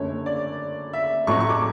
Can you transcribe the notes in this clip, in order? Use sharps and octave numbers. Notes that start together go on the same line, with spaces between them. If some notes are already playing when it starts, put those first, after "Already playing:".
Already playing: F#1 F#2 D3 A3 C#5
D5
E5
A1 A2 F#3 A3 C#6
C#6
D6